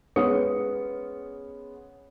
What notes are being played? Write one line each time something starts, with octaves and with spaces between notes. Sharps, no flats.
G#3 B3 C#4 D#6 C#7